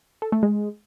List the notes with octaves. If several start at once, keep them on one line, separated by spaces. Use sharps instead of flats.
A4
A3
G#3